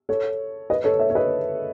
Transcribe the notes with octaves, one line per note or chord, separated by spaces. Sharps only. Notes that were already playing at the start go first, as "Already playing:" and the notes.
A4 C#5
B4 D#5
A4 C#5
C#5 E5
C#5
B4 D#5